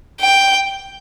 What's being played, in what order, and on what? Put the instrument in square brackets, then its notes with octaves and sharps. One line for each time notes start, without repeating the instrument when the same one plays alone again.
[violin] G5